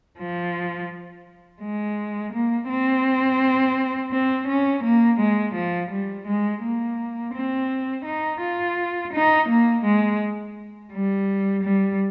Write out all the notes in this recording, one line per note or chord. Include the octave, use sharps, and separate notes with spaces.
F3
G#3
A#3
C4
C4
C#4
A#3
G#3
F3
G3
G#3
A#3
C4
D#4
F4
D#4
A#3
G#3
G3
G3